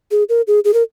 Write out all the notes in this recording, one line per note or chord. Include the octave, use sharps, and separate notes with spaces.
G#4
A#4
G#4
G#4
A#4